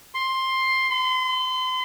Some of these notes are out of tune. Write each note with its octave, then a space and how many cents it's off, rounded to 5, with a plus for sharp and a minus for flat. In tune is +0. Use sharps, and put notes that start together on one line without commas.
C6 +10
C6 -35